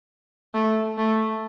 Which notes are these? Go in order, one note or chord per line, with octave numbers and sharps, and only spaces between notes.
A3
A3